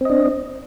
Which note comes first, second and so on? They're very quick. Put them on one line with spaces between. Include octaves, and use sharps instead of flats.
C4 D#5 D4